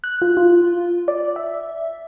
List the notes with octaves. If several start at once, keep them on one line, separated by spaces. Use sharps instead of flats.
F#6
F4
F4
D5
E5